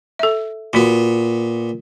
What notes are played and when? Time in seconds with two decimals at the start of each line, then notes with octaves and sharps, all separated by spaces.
0.19 A4 E5
0.73 A#2 B3 F4 F#4